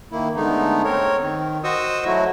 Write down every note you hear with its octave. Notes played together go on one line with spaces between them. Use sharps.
D#3 A#3 E4
D3 G#3 A3 B3 D#4
C4 A#4 C#5
D#3
F#4 C5 D#5 C#6 D#6 E6
F#3 A3 E4 F#4